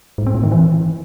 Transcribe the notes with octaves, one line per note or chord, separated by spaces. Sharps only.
G#2
C4
A2
D#3
E3